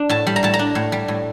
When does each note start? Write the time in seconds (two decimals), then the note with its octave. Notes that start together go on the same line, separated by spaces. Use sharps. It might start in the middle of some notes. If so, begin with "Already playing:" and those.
Already playing: D4
0.09 A2 A5
0.27 G3
0.36 A#5
0.43 A2 A5
0.54 A#5
0.59 D4
0.75 A2
0.92 G3
1.08 A2